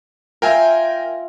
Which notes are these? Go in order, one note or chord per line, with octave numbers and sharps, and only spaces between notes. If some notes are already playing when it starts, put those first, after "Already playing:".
F4 A#4 E5 F5 G5 G#5